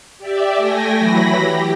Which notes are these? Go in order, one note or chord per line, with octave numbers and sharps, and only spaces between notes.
G4 D5 E5
A3 G5 G#5 A#6
E3 F#3 B5 A#6
G4